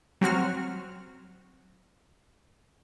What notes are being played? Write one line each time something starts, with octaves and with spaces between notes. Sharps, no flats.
F#3 C4 F#4 F6